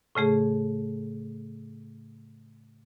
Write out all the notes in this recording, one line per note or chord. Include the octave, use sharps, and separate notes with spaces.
A2 C#3 A3 G#4